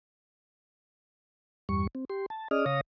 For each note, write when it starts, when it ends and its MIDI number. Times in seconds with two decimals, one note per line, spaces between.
1.69 1.87 40
1.69 1.87 43
1.69 1.87 55
1.69 1.87 85
1.95 2.05 60
2.10 2.26 67
2.10 2.26 84
2.30 2.48 81
2.51 2.65 61
2.51 2.65 68
2.51 2.65 74
2.51 2.65 75
2.51 2.65 87
2.51 2.65 89
2.66 2.81 49
2.66 2.81 73
2.66 2.81 77
2.66 2.81 87
2.66 2.81 94